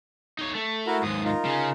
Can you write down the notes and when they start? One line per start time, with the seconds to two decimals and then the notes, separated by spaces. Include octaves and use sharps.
0.39 D#4 C#5
0.55 A3
0.87 E4 F#4 A#4
1.03 D#2 G#2 D#6
1.24 D#4 F4 A#4
1.45 C#3 C#4